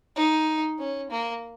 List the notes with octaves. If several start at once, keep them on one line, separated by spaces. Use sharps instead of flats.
D#4
C#4
A#3